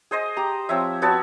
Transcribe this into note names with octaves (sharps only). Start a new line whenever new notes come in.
G#4 C5 D#5
G4 A#5
F3 C4 C#5 E5
B3 F#4 C#5 A5